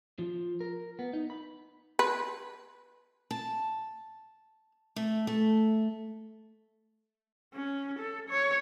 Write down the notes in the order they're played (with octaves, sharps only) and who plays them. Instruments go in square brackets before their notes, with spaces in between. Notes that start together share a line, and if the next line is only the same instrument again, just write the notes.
[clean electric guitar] F3
A#4
B3
D#4
B5
[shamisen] B4
[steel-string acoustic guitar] A5
A3
A3
[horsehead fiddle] C#4
A4
C#5